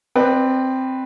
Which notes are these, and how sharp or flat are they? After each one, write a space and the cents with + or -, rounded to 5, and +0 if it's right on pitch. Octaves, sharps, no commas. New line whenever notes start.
C4 +0 B4 +0 D5 +40